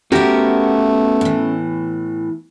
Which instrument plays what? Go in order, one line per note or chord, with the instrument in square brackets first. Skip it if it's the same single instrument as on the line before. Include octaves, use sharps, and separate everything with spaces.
[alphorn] A3 [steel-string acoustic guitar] B3 F#4 [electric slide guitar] C#4 E5 [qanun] G4 A#4
[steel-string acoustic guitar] A2 E3